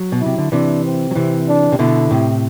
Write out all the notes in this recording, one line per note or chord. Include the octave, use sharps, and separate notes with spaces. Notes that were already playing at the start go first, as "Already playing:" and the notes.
Already playing: F#3
B2
E4
C3
D3
C3 E3 D4
C4
F#3
C3 E3
D4
C3
B2 D3 E4
A2 C3